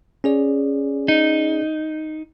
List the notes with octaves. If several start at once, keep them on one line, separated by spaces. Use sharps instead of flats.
C#4 G#4 D5
D#4